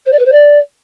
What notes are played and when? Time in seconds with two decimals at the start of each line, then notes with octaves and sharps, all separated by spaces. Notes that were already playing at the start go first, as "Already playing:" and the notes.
0.05 C5
0.12 D5
0.19 B4
0.25 C5
0.32 D5